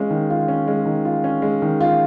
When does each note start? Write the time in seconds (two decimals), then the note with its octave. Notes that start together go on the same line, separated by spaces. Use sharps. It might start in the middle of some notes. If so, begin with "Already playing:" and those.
Already playing: G#3 C#4 F4
0.11 D#3
0.30 F4
0.48 C#4
0.68 G#3
0.86 D#3
1.05 F4
1.24 C#4
1.42 G#3
1.62 D#3
1.81 F4